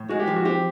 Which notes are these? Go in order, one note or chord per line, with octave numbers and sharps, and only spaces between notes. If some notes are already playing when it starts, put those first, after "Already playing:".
Already playing: A2
G#3 F#4
G4
F3
F#4
C4 G4